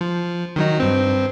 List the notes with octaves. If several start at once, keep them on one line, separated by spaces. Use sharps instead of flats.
F3
D#3 F#3 D#4
G2 C4